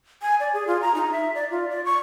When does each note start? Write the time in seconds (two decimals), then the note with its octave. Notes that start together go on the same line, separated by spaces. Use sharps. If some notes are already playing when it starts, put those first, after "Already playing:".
0.22 G#5
0.40 D5
0.53 G#4
0.67 F4
0.82 A#5
0.95 D#4
1.12 E5
1.35 D5
1.51 F4
1.70 D5
1.85 C#6